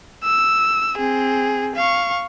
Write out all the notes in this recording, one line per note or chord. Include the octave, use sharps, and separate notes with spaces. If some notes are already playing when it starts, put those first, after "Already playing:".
E6
C4 G#4
F5 C#6